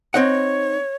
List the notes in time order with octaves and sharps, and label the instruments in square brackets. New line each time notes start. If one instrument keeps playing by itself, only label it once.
[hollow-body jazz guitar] C4 D#4 F#5 [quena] C#5